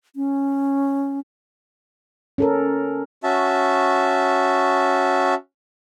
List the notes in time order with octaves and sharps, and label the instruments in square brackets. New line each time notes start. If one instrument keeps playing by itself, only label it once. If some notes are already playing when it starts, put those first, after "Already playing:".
[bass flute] C#4
[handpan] C#4 A4 A#4
[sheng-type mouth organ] C#4 F#4 E5 A5